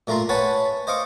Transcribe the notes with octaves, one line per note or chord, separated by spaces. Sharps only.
A#2 A3 F4 A#5 C6
B4 C#5 F#5 G#5 A5 B5
C5 D#5 F5 C#6 D6